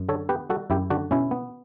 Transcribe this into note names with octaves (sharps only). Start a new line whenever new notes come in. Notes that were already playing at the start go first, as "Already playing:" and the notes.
Already playing: F#2
D3 A4 C#5
B3 G4 B4
G3 F#4 A4
F#2 E4 G4
D3 D4 F#4
B2 C#4 E4
B3